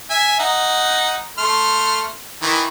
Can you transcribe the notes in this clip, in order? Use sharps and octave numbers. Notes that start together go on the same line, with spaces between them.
E5 G#5
D#4 F#5
A3 C6 F6
D#3 E3